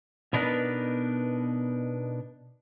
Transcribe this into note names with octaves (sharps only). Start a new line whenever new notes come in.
B2 B3 D4 D#4 A#4 B4